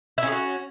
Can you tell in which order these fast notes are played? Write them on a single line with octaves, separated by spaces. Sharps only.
E4 C#4 G#4 F#4